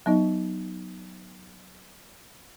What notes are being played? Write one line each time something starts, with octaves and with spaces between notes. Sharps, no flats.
F#3 B3 D#4 D#5